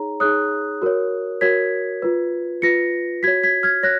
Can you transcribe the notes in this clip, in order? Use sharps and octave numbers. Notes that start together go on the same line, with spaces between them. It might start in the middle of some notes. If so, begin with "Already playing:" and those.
Already playing: D#4 G#4 C#5 A#5
D#4 G#4 C#5 D#6 F#6
F#4 A#4 C#5
F#4 A#4 C#5 G#6 B6
F4 B4
F4 B4 A#6 C#7
F#4 C#5 G#6 B6
G#6 B6
F6 G#6
C#5 F#6 A#6